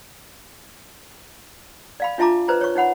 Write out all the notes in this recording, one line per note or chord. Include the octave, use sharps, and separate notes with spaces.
D5 F5 B5
D4 F4 E5 A5 A#5 D6
B4 C5 D5 A#5
C#5 C#6
D#4 C#5 F#5 B5